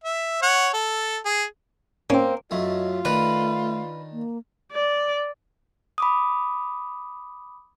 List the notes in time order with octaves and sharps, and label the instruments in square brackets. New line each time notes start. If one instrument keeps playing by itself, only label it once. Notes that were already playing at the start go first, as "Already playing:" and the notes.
[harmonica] E5
C#5 F#5
A4
G#4
[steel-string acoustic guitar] A#3 C4 [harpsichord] C#4
[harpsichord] F#2 A3 [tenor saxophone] F4 [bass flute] D#5
[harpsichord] D#3 D4 A#4 [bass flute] A3 [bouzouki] B4
[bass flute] A#3
[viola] D5
[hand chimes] B5 D6 D#6